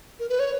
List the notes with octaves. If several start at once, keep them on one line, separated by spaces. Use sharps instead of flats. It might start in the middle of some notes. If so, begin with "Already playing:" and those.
A#4
B4
C#5